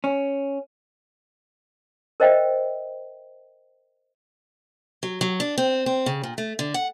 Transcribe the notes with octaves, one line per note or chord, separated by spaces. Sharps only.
C#4
A#4 C5 D#5 E5 G5
F#3
F#3
D4
C4
C4
C#3
A#2
A3
D3
F#5